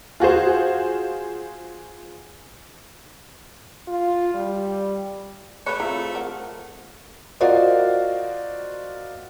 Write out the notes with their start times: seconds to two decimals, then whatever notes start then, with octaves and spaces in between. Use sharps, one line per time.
0.20 F4 F#4 G#4 C5
3.88 F4
4.34 G3
5.66 A3 B4 C#5 B5 F#6 C#7
5.80 C4 E4 F4 G#4 A#5
6.15 A#4 F#5
7.41 F4 F#4 A#4 C5 D5 D#5